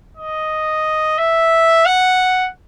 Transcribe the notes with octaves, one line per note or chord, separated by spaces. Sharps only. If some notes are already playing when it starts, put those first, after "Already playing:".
D#5
E5
F#5